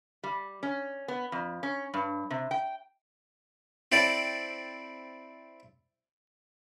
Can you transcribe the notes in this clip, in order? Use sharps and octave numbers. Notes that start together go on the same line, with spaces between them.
G3
C#4
B3
F2
C#4
G2
C3
G5
C4 E4 A4 D5